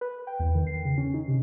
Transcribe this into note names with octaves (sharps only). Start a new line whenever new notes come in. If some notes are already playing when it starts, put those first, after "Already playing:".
B4
G5
E2
D#3
C7
C#3
C#4
D#4
C3